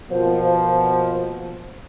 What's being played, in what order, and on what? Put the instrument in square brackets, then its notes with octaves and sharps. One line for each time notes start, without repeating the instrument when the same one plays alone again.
[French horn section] B2 F3 A#3 [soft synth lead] C5